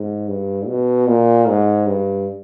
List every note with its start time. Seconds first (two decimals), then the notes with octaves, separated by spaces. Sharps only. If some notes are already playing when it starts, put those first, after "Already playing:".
Already playing: G#2
0.28 G2
0.67 B2
1.08 A#2
1.48 G#2
1.87 G2